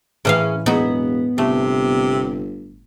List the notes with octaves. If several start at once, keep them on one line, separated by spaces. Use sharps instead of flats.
A2 E3 C#4 G#4 A#4 F5
E1 F#3 B3 D#4 G#4
G1 C3 A3